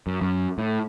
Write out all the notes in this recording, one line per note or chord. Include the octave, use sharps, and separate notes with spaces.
F#2
F#2
A2